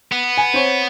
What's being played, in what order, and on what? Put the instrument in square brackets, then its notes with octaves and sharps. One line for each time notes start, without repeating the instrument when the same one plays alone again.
[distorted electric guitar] B3
[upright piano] G#5
C4 C#5